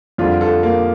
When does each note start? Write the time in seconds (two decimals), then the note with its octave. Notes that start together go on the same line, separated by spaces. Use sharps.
0.18 F2 D3 G3 D4 F4
0.41 F4 A4
0.63 A#3